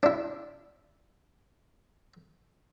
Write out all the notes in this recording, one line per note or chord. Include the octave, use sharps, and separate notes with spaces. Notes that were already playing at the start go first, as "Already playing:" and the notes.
D4 E4